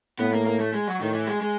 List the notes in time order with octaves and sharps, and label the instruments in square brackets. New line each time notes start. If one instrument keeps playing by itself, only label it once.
[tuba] A2 [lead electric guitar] B3
[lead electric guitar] A#3
A#3
A3
G#3
F#3
[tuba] A2 [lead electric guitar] D#3
[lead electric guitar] E3
G#3
G#3